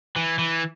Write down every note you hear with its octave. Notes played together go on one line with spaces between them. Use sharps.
E3
E3